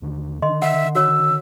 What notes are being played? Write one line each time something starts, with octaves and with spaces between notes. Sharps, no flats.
D#2 D3 D4
D3 D#3 D4 D#5 C6
E5 F#5
F#4 C#5 E6